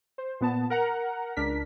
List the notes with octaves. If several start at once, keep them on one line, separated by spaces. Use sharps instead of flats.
C5
A#2 B3 A5
A#4 F#5 A#5
C#2 D4 A#4 B6